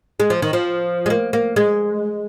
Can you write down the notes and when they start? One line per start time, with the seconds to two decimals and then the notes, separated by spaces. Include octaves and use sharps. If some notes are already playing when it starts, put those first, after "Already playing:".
0.20 G#3
0.30 F3
0.42 D#3
0.53 F3
1.06 G#3
1.10 A#3
1.33 A#3
1.56 G#3